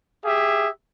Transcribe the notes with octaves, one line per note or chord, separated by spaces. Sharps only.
G4 G#4 E5